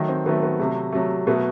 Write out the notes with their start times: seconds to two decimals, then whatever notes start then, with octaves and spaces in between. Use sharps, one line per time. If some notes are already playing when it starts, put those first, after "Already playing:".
Already playing: D#3 F#3 A3 D#4
0.09 C4
0.25 D#3 F#3 A3 B3
0.42 B3
0.59 C3 F#3 A3
0.92 C3 F#3 A3
1.27 B2 F#3 A3 B3